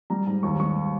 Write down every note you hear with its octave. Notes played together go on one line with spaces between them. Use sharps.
G3 A#5
G#2 A#5
D#2 C#6
G3 C#6